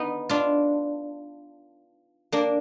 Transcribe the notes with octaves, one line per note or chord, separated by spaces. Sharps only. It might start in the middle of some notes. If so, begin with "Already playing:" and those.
Already playing: B3 D#4
D4 F4
A#3 D4